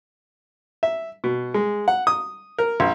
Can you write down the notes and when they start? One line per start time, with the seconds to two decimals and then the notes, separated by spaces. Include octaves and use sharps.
0.83 E5
1.24 B2
1.54 G#3
1.88 F#5
2.07 D#6
2.58 A#4
2.80 A#1